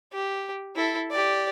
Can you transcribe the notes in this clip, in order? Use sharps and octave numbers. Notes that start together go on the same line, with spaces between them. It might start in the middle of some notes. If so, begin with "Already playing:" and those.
G4
E4 A4
G4 D5